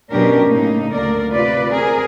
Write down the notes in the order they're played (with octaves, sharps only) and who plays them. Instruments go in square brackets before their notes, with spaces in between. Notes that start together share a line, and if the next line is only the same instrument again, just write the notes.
[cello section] B2 F#3 C#4 D4 G4 A#4
A2 C#3 A#3 D#4
D2 A#3 A#4 D5
C3 F4 B4 D5
C4 G#4 A#4